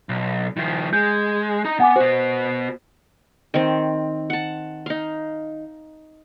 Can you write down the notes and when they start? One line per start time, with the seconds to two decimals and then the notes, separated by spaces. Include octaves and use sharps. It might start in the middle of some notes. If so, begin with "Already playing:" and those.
0.09 B1
0.57 D#3 F3
0.93 G#3 G6
1.65 D#4 A#5
1.80 B3 F#5 G#5 D6
1.96 B3 F#4 C5
3.54 D#3 C4
4.30 F#5 A5
4.86 D#4 F5